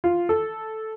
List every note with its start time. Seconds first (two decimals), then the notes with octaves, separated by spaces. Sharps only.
0.04 F4
0.29 A4